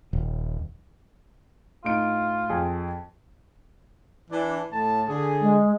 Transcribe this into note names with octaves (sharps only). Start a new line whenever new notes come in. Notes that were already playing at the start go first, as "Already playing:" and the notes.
D#1
A2 D#4 F4 D7
F2 G#4
E3 D4
A2 A5
D3 G#4
G#3